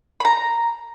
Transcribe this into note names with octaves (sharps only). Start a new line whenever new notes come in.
A#5 B5